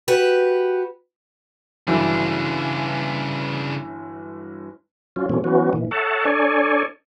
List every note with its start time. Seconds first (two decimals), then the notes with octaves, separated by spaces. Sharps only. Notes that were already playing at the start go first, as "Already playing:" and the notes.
0.08 F#4 G4 B4
1.87 G1 C#3 E3 F#3 D4
5.16 F#3 C#4 F4
5.30 B2 E3 F#3 A3 C4 C#4
5.44 E3 F#3 B3 C#4 F#4
5.73 A#2 D#3 E3
5.91 A4 C#5 E5 F#5 A5
6.25 D4 A4 C#5 D5 G#5